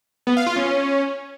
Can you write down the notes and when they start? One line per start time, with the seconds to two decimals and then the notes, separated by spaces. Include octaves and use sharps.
0.27 B3
0.37 F5
0.47 F4
0.56 C#4